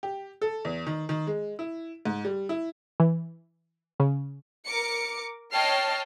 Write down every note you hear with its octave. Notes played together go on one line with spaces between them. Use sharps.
G4
A4
E2
D#3
D#3
G#3
E4
G#2
G3
E4
E3
C#3
A#4 D6 C#7
C#5 D#5 G5 A5 F6 C7